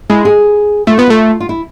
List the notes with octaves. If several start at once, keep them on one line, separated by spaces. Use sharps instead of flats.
G#3 E4
G#4
A3 F4
B3 F4
A3 F4
F4
E4